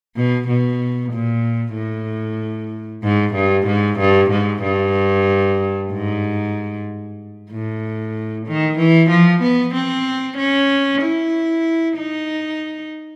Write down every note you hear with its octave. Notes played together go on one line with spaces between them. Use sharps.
B2
B2
A#2
A2
G#2
G2
G#2
G2
G#2
G2
G#2
A2
D#3
E3
F3
B3
C4
C#4
E4
D#4